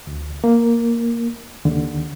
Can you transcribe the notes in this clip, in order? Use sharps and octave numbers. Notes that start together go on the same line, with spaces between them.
D2
A#3
D#2 D3